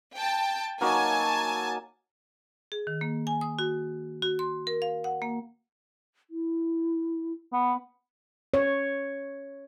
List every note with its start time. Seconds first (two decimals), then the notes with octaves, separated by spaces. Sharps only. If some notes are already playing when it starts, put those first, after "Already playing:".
0.15 G5 A5
0.81 F#3 A#3 D#4 G#5 A5
2.72 G#4
2.87 D#3
3.01 A#3
3.27 G#5
3.41 D#6
3.59 F#4
4.22 F#4
4.39 C6
4.67 A#4
4.82 F5
5.04 F#5
5.22 A#3
6.30 E4
7.53 B3
8.54 C#5